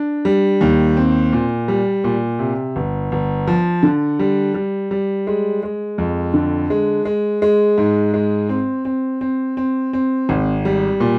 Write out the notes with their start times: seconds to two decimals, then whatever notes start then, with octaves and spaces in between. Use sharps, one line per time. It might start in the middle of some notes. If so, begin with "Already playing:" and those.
Already playing: D4
0.25 G3
0.61 D#2
0.97 C4
1.33 A#2
1.68 G3
2.04 A#2
2.39 C3
2.76 G1
3.12 G1
3.47 F3
3.83 D3
4.19 G3
4.54 G3
4.91 G3
5.27 G#3
5.63 G#3
5.98 F2
6.34 D3
6.70 G#3
7.05 G#3
7.42 G#3
7.78 G#2
8.14 G#3
8.49 C4
8.85 C4
9.21 C4
9.57 C4
9.93 C4
10.29 G#1
10.65 G3
11.00 A#2